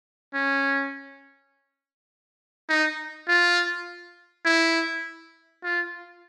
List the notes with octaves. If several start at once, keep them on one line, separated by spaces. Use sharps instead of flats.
C#4
D#4
F4
E4
F4